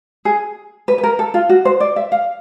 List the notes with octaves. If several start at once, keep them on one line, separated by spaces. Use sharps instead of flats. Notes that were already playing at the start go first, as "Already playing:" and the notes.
G#4
B4
B4
A#4
A4
F4
F#4
C5
D5
E5
F5